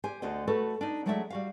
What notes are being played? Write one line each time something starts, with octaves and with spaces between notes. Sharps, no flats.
G4 C5 G#5
D2 D3 F#4 C5 D#5
A3 F#4 A4 B4
D4 D#4
F#3 G#3 A3 D4 F#4 E5
G3 F#4 F5